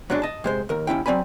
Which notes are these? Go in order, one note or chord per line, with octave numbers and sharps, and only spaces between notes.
F#2 F#3 G#3 D4
D#5 A5
C3 G#3 C5
D#2 A#4
D#2 C#4 E4 G5
F#3 C4 D5 G#5 B5